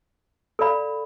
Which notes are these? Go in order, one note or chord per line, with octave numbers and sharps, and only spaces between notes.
A4 D5 F5 B5